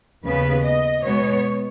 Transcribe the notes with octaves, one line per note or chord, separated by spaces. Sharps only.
D#2 C#3 B3 B4
D#5
B2 G#3 B3 C#5